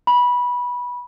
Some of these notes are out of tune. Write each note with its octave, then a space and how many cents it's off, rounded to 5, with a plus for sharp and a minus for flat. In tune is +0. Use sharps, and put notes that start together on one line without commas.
B5 -15